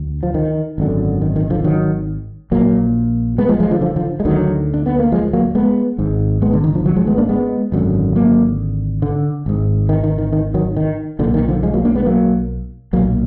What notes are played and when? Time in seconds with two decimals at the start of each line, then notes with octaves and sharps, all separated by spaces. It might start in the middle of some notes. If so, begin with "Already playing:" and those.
Already playing: D2 D3
0.23 F3
0.34 D#3
0.78 G#1 F#2 D3
1.22 D#3
1.36 D#3
1.50 D3 F3
1.64 D#3 F#3
2.51 A#1 A#2 F#3 A#3
3.38 G#3 B3
3.49 F3 G#3
3.60 F3 G#3
3.71 D3 F3
3.81 D3 F3
3.96 D3 F3
4.20 G#3
4.25 D2 D3 D#3 F#3
4.74 D4
4.86 B3
4.99 A#3
5.12 F3 G#3
5.33 F#3 A#3
5.55 G#3 B3
5.98 G#1 G#2
6.42 G#3 B3
6.53 D3
6.64 D#3
6.75 D3 F3
6.86 D#3 F#3
6.96 F3 G#3
7.07 G#3 B3
7.18 A#3 D4
7.29 G#3 B3
7.72 G#1 F#2 D3
8.15 F#3 A#3
9.02 D3
9.46 G#1 G#2
9.89 D#3
10.04 D#3
10.18 D#3
10.33 D#3
10.54 D#3 F#3
10.77 D#3
11.19 B1 A#2 D3
11.34 D#3
11.48 D3 F3
11.63 F3 G#3
11.74 F#3 A#3
11.85 A#3 D4
11.95 G#3 B3
12.06 F#3 A#3
12.93 B1 A#2 F#3 A#3